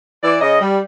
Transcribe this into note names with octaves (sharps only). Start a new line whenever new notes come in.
E3 D5
C#3 D#5
G3